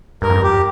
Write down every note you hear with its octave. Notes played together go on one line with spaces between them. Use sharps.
G2 A#4
F2
G2
G4